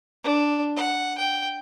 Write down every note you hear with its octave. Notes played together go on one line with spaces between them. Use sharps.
D4
F#5
G5